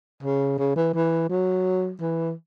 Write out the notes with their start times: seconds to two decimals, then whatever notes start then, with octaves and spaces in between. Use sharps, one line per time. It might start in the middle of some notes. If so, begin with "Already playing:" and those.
0.23 C#3
0.59 C#3
0.76 E3
0.94 E3
1.30 F#3
2.01 E3